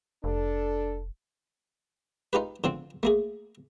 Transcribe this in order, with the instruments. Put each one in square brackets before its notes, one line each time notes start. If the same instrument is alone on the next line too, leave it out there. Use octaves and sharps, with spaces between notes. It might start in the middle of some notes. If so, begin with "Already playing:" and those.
[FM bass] F1 [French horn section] D4 A4
[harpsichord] D#4 F4 G4 B4
D3 F3 C4
A3 A#3 G#4